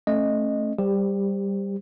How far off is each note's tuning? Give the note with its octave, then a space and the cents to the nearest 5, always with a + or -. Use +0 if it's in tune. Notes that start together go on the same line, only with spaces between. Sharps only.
A3 +0 C#4 -25 D#5 -15
G3 +0 G4 +25 C5 +0